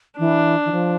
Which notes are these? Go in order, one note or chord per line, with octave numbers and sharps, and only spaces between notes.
E3 D4
E3
F3